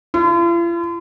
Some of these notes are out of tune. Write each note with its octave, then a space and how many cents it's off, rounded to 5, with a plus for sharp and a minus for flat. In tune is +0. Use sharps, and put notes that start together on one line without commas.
F4 -45